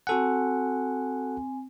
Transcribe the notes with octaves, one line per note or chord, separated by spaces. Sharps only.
C4 F#4 A4 F#5 G#5